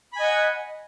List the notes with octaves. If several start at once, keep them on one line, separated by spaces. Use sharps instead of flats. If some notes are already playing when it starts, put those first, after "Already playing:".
D#5 F#5 G#5 B5